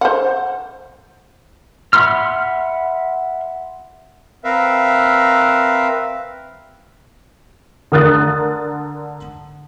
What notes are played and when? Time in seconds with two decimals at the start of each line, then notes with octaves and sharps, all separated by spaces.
0.01 C5 F#5
1.93 E5 F#5 B5 C6 F6
4.44 C4 A#4 B4 E5 F5
7.92 D3 A#4 D#6 F#6 A6